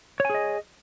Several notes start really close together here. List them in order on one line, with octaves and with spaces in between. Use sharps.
C#5 G#5 G#4 D#5